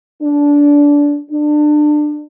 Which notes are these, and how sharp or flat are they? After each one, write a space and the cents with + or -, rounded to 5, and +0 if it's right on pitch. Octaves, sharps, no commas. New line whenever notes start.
D4 -20
D4 +25